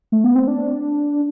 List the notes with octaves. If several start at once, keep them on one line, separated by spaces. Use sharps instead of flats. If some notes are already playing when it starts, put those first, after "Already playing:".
A3
B3
C4
D4